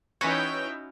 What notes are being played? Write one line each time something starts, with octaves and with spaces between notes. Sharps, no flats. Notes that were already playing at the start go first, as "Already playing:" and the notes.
E3 C#4 D#4 E4 F#4 B4 C#5 G5